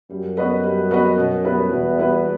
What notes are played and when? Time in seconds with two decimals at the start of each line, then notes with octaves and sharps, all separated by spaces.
0.10 F#2 G3
0.37 B3 F#4 B4 D#5
0.63 G3
0.91 B3 F#4 B4 D#5
1.17 B2
1.44 G3 B3 E4 B4
1.70 E2 B2
1.98 G3 B3 E4 B4